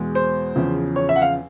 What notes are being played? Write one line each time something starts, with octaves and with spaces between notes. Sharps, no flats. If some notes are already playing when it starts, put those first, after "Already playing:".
Already playing: E2 B2 G#3
C5
E2 C#3 F3
C#5
E5
F#5
F5